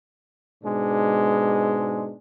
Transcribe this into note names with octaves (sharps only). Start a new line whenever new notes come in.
G#2 B2 G#3 D4